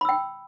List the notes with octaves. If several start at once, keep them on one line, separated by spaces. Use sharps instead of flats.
G5 B5 E6